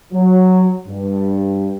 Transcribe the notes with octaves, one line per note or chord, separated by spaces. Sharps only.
F#3
G2